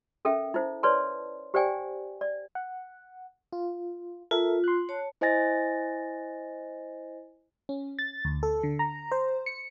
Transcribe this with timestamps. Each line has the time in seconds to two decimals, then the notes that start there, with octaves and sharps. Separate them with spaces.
0.25 C#4 A4 A#4 E5 G5
0.54 D#4 E4 C5
0.83 B4 C#5 D5 A5 C6
1.54 G4 C5 D5 G5 G#5
2.21 D5
2.55 F#5
3.53 F4
4.31 F4 A4 A#4 E5
4.64 C6 F#6
4.89 C#5 A5
5.21 E4 C5 D#5 G#5 A6 A#6
7.69 C#4
7.99 A6
8.25 D2
8.43 A4
8.63 D3
8.79 A#5
9.12 C5
9.46 C#7